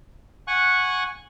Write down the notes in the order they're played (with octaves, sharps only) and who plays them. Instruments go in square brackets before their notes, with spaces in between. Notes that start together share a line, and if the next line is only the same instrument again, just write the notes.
[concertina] F#5 G#5 C#6 F#6